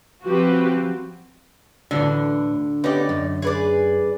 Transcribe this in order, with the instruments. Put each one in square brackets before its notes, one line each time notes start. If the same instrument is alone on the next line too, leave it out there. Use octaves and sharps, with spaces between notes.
[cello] F3 C4 [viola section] F#4 G4 B4
[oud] D2 [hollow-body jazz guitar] A2 E3 D4 [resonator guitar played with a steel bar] D3
[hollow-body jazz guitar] B3 C#4 G4 [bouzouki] D#4 D5
[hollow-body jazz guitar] F#2
[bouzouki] G#4 B4 D5